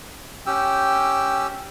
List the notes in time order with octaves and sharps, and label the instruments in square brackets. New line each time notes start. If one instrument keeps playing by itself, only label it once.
[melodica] C#4 G4 E6 [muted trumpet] G5